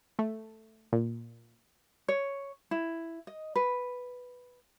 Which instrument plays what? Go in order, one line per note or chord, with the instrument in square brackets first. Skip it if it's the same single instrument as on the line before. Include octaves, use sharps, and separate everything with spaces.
[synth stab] A3
A#2
[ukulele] C#5
E4
D#5
B4